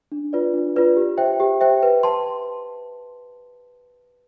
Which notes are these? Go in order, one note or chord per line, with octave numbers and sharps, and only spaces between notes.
D4
F4 B4 D5
D4
F4 B4 D5
G4
C5 E5 G5
G4
C5 E5 G5
B4
A5 C6